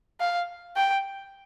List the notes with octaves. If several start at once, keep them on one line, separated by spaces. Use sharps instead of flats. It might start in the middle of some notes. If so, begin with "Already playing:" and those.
F5
G5